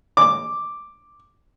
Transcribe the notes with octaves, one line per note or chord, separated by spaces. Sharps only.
D6